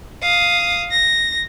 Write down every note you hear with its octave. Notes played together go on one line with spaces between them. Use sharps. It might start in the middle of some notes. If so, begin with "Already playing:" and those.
F5 D#6
A#6